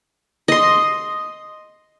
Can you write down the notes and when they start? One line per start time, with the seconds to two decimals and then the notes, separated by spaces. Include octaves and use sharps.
0.48 D#5 C6